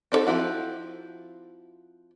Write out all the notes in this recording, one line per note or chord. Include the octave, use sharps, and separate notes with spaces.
C4 D4 D#4 A4
F3 C4 E4 F#4